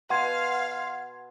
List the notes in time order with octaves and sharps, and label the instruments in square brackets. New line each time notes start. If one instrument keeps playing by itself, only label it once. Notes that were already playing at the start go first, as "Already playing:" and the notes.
[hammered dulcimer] B2 [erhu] F5 [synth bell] F#5 C6 G#6